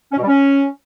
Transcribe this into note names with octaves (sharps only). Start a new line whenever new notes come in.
C#4
B2
G3
C#4